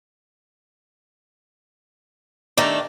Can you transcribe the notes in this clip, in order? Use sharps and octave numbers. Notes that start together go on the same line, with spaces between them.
D#3 A3 D4 D5 E5 A#5